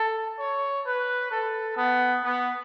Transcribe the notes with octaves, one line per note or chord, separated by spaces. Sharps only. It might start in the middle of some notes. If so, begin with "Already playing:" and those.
Already playing: A4
C#5
B4
A4
B3
B3